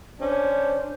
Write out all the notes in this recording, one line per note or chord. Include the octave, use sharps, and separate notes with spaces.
C#4 D4 C5